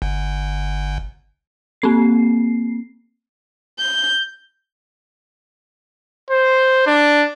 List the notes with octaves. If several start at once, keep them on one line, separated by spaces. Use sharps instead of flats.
G1
A#3 C4 C7
G6
C5
D4